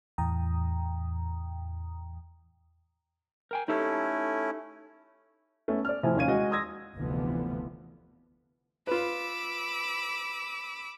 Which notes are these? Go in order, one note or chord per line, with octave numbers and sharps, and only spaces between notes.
E2 A2 E3 G5 A#5 D#6
A#4 G5 G#5
A3 C#4 D#4 E4 G4 A4
A3 B3 C#4
D5 F6
A2 C3 F3 E4 G#5
D#1 D#3 C#4 F5 G#6 D#7
G#3 F#4 G#4 D#5
C6 D#6 E6 G#6 A#6
F1 D2 D3 E3 F3 B3
F4 B4 B5 D6 E6